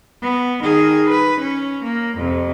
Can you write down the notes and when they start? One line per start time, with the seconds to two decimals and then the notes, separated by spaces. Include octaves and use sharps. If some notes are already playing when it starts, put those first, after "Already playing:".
0.22 B3
0.63 D#3 G#4
1.10 B4
1.40 C#4
1.84 A#3
2.18 F2 C3